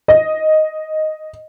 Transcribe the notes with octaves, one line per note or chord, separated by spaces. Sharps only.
D#5